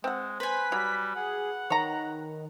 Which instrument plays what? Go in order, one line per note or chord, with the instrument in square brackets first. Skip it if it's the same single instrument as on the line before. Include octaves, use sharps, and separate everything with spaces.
[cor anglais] G#3 [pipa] C4 F#5
[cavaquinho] B4 G#5 [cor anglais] C5 [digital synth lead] B6
[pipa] F#3 [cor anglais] G3
[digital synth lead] G#4 [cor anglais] F#5
[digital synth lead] D#3 [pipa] C#5 A#5